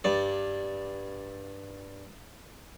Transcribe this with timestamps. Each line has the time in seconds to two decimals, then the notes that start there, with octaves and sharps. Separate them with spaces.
0.04 G2 D5